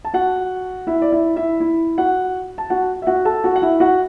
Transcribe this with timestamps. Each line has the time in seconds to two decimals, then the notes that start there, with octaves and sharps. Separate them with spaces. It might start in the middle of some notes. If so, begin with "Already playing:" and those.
0.05 A5
0.14 F#4 F#5
0.87 E4 E5
1.02 D5
1.12 E4 E5
1.36 E4 E5
1.60 E4
1.98 F#4 F#5
2.58 A5
2.70 F#4 F#5
3.02 E5
3.07 F#4 F#5
3.25 A4 A5
3.44 F#4 F#5
3.56 F#5
3.62 E4 E5
3.80 F#4 F#5